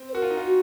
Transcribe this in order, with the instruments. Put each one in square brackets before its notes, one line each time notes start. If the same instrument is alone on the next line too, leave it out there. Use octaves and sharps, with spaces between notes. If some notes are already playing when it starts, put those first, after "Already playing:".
Already playing: [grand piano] C4
[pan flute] C5
[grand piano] F#4 [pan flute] A#4
[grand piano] F4
D#4
F4
[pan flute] F#4